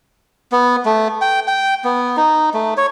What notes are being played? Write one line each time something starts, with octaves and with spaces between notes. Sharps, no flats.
B3
A3
G5
G5
B3
D#4
A3
C#5